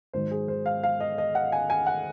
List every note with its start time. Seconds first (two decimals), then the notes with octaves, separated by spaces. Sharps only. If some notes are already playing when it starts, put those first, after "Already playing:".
0.13 G#2 D#3 F#3 C5
0.31 G#4
0.48 C5
0.66 F5
0.83 F5
1.00 D#5
1.18 D#5
1.35 F#5
1.52 G#5
1.70 G#5
1.87 F#5